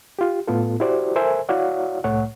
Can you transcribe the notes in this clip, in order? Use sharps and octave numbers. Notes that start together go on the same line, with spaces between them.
F4 G4
A2 B3 F4 A4
E4 F#4 G4 C5 D5
A4 A#4 C5 E5 G#5
E4 F#4 C#5 D5 F5 F#5
C2 A2 A3 C#5 F#5